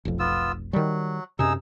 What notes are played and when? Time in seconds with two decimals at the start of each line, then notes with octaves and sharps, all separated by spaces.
0.05 F1 B1 F2
0.19 B3 F4 E6
0.73 D#3 F#3 G3
1.39 F#2 C3 D#4 G#4 E6